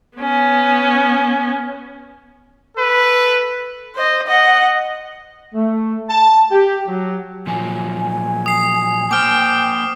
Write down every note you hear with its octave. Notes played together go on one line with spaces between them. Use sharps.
B3 C#4
A4 B4
C5 D#5
D#5 F#5
A3
A5
G4
F#3
A#2 F3 F#3 G#5
D#6 C7
A#3 C5 G5 D6 F6